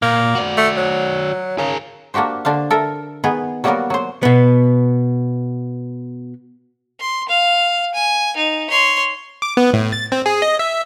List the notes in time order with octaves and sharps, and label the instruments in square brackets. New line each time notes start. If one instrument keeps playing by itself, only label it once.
[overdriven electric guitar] A#2 [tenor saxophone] A#3
[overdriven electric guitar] F#4 D5
[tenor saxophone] A3
F#3
[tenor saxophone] C#3 [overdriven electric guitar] G#4 A#4
[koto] A#3 D4 F#4 G4 C5
D3 D4 C5 F5
A4 A#4 E5
D#3 B3 G#4 B4
F#3 G3 A#3 B3 F#4 A#4
F#3 C5
[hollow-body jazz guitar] B2 B3
[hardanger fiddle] C6
F5
G#5
D#4
C#5 C6
[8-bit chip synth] D6
B3
A2
A6
C4
G#4
D#5
E5